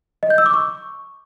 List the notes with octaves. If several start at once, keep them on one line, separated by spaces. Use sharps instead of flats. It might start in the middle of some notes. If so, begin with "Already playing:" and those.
D#5
G6
E6
D6
C#6